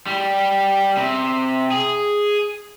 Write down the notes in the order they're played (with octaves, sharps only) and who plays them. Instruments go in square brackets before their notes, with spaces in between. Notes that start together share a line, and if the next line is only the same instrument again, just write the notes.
[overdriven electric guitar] G3
C3
G#4